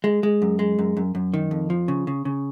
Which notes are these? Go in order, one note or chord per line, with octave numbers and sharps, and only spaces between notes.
G#3
G#3
F#2
G#3
F#2
F#2
F#2
D#3
F2
F3
C#3
C#3
C#3